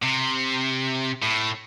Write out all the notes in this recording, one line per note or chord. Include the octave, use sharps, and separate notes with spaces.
C3
A2